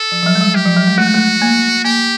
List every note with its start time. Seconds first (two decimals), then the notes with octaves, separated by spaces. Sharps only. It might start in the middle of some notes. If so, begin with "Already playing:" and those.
Already playing: A4
0.12 F3
0.22 F3
0.26 F#3
0.35 G#3
0.41 G3
0.55 F#3 G4
0.66 F3
0.77 F#3
0.87 G#3
0.98 A3 F#4
1.06 G#3
1.14 A3
1.42 A#3
1.84 A#3 G4